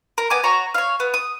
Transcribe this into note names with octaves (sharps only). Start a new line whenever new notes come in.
A#4
B3 G#5 D6
F#4 C#5 A#5
C#5 F5
B3
D#6